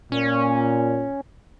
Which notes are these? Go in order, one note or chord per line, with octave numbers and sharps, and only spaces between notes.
A#2 C#4